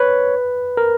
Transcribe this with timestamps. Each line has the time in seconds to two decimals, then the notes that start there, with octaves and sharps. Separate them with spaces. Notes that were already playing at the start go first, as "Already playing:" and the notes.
Already playing: B4 C#5
0.77 A#4